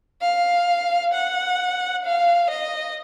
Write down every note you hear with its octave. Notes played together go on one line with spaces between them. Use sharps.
F5
F#5
F5
D#5